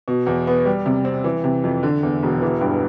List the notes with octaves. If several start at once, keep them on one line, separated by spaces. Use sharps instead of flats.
B2
E2
B3
G3
C3
C4
E3
C3
F2
D3
E2
E1
E3
G2